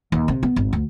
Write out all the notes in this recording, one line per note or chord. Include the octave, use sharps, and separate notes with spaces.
D#2
C3
B3
G#1
D2